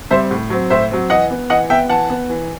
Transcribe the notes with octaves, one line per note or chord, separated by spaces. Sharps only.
G3 C4 C5 E5
A2
F#3 C4
A2 C5 E5
F#3 C4
E3 D#5 F#5
B3
E3 D#5 F#5
B3 E5 G5
E3 F#5 A5
B3
E3